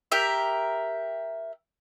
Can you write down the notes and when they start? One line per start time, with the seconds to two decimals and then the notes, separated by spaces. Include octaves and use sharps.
0.12 G4 A#4 E5